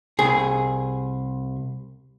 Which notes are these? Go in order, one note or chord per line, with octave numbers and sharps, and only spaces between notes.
C2 G#4